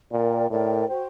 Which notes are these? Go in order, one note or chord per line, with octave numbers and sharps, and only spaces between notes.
A#2 A#4 D5 G5
A2 A#4 D5 G5
F#4 C5 G5